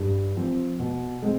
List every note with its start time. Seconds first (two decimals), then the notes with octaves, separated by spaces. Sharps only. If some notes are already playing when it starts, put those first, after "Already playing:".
Already playing: G2
0.36 F3 C4
0.79 B2
1.22 G#3 C4